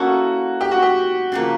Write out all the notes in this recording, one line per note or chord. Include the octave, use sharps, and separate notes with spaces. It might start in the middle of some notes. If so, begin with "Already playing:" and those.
Already playing: A#3 C#4 E4 F#4 A4
G4
F#4
G4
C#3 F3 A#3